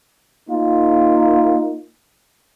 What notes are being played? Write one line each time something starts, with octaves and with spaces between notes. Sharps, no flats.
A#3 D#4 F4